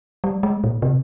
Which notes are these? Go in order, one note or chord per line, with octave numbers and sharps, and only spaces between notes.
G3
G#3
A#2
C3